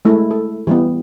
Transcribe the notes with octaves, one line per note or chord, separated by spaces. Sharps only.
G#3 A3 E4
A4
E3 G3 B3